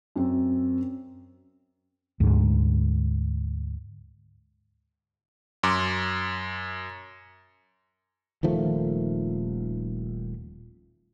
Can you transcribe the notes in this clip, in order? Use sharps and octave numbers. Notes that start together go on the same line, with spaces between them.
F#2 C4
D2 G#2
F#2 C6 D6
D#1 D#3 F3 A3